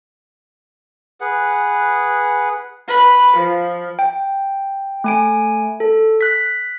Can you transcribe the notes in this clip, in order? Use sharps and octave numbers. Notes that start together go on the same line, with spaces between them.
G#4 B4 F#5
B4
F3
G5
A3 G#5 D7
A4
F#6 B6